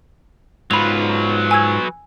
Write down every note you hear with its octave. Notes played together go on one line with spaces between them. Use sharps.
G#2 F#3 F4 B4 B5 F7
G#5 E6 G#6